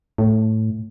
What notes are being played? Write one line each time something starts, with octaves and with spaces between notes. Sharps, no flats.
A2